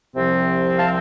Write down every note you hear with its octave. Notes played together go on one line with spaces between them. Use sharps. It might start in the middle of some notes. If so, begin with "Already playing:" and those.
C2 C3 F3 C4
F5 A5